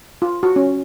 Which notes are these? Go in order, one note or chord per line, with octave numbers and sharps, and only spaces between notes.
F4
F#4
C#4